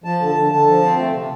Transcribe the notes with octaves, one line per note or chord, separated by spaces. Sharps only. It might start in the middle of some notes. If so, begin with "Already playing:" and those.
F3 A5
D3
A5
D3
D3 A5
F3
C4
A3
C3